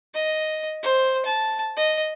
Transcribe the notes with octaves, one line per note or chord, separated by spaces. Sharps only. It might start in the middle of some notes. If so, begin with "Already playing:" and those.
D#5
C5
A5
D#5